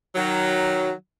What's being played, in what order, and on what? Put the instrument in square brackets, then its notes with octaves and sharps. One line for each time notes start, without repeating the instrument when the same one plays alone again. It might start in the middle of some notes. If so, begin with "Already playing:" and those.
[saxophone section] D#3 F#3